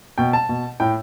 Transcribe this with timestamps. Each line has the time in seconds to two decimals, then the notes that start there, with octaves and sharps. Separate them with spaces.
0.18 B2 G5
0.33 A5
0.49 B2
0.80 A2 G5